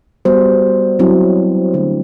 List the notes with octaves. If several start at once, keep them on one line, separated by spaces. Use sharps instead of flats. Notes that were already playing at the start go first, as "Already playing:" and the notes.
G3 B3 F#4 C5
F#3 C4 E4
D3 F#3 A3 D4